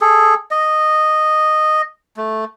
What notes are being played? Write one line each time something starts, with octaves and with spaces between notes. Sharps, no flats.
G#4 A4
D#5
A3